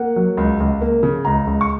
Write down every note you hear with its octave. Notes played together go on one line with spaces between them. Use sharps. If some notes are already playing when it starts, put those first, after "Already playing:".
Already playing: A#3 F#5
F#3
C#2
C#2
A#3
C#3
C#2 A#5
C#2
C#6